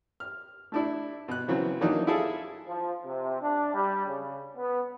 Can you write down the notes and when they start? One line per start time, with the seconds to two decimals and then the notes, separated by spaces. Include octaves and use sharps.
0.20 F6
0.72 A3 D4 E4
1.28 B2 F#6
1.48 C#3 E3 F#3 B3 C4
1.81 D#3 E3 F#3 A#3 D4 D#4
2.07 E4 F4 G#4 A4
2.67 F3
3.05 C3
3.41 D4
3.74 G3
4.07 C#3
4.57 B3